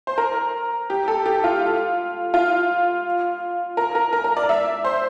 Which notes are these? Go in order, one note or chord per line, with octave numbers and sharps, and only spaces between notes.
C5
A#4
G4
A4
G4
F4
F4
A#4
A#4
A#4
A#4
D5
E5
C5